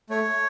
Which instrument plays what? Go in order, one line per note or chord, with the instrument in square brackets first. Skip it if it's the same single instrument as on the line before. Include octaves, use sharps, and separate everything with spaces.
[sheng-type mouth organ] A3 C#5